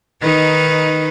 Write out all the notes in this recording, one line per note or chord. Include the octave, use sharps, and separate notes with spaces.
D#3 D#4 B4